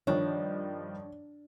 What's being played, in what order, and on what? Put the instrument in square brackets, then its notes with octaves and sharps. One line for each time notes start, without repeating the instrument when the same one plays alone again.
[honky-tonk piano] G2 D#3 F3 [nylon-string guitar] D4 [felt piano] C#5